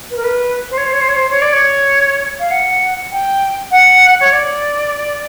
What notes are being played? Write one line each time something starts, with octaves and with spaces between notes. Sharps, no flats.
B4
A#4
B4
C5
C#5
C5
C#5
C5
C#5
C5
C#5
D5
C#5
F5
F#5
G5
F#5
C#5
D5